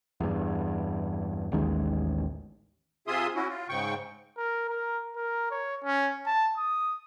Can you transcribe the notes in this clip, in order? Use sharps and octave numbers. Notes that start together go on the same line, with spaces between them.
E2 G2
A1 D#2 D#3 G#3
C3 F4 G#4 E5 C6 D#6
C#4 E4 F#4
F4
G#2 C#3 G5 C#6
A#4
A#4
A#4
C#5
C#4
A5
D#6